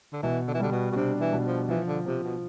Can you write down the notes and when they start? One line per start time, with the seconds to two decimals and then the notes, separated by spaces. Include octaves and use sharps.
0.13 D3
0.22 B2 E3
0.47 D3
0.54 E3
0.59 D3 G3
0.72 B2
0.91 B2
0.96 C3 D4
1.20 E3
1.33 B2
1.45 F3
1.69 E3 F3
1.87 D3
2.05 C3 F3
2.24 B2